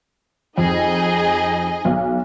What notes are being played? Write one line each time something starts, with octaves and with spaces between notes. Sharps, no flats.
F2 D#4 G#4 D#5
B1